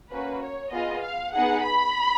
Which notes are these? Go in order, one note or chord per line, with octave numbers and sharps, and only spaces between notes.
A#3 C#4 F#4 B4
C#5
B3 F4 G#4 D#5
F5
B3 D#4 G#4 F#5
B5